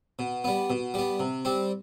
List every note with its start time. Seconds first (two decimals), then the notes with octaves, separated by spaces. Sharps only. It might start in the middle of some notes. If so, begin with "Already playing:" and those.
0.19 B2
0.44 G3 B3
0.70 B2
0.94 G3 B3
1.20 C3
1.45 G3 C4